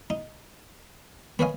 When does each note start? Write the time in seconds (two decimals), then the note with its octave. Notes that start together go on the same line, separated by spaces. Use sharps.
0.10 D#4
1.39 B3 B4 C#5 D#5 F5 G#5